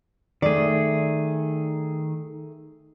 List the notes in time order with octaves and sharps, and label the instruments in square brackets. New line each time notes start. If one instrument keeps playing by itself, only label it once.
[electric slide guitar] D#3 G#4 [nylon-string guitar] A3 D5